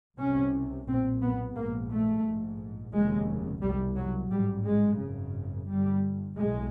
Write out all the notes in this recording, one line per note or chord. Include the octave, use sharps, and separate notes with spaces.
C2 C3 C#4
B1 A#2 C4
B3
A#1 G#2 A#3
A3
A#1 G#2
F1 D#2 C#3 G#3
C2 B2 G3
F#3
A1 G#2 G3
G#3
G#1 F#2 C#3
G1 G2 G3
B1 A2 G#3